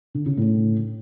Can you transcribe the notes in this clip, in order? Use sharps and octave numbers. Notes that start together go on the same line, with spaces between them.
D3
C#3
A2